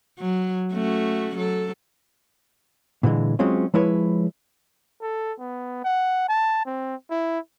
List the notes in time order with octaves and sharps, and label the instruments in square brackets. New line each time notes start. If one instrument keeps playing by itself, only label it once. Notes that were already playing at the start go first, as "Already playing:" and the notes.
[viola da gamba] F#3
A3 C#4 F#4
F#3 A4
[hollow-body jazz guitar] A#2 D3 E3 G#3
F#3 G#3 C4 C#4 F4
F3 G#3 E4 B4 C#5
[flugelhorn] A4
B3
F#5
A5
C4
E4